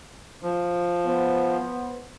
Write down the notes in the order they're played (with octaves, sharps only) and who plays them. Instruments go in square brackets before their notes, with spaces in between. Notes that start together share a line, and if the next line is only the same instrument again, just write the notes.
[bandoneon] F3
[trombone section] B3 C5